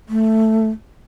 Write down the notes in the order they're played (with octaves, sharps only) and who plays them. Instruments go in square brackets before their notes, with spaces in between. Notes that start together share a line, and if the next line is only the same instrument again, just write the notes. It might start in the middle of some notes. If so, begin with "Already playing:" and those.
[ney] A3